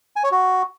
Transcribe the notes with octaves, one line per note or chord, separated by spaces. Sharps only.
G#5
C#5
F#4